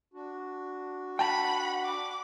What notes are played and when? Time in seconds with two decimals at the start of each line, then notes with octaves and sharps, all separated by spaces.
0.14 D4 F#4
1.19 F#5 G5 A5 B5
1.84 D6